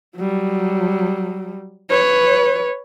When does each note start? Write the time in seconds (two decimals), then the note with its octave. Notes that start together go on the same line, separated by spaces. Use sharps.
0.16 F#3 G3
1.90 B4 C#5